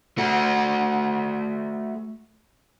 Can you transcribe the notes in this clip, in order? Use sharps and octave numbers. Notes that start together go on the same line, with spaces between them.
A3 F#4